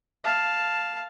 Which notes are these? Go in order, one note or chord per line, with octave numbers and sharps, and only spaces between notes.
F5 A5